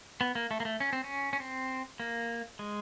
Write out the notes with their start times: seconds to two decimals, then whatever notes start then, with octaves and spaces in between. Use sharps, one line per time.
0.21 B3
0.35 A#3
0.51 A3
0.60 A#3
0.65 A3
0.80 C#4
0.93 C4
1.04 C#4
1.33 C#4
1.40 C4
2.00 A#3
2.59 G#3